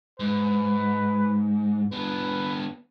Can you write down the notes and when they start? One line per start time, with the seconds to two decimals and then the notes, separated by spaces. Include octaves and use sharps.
0.20 G#2 B4
1.92 B3 D4 B4